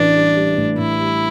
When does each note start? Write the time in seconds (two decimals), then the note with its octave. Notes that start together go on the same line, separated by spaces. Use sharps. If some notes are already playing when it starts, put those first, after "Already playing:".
Already playing: A1 A2 E3 D4
0.16 G3
0.37 G3
0.57 A2
0.78 A2 E4
1.00 G3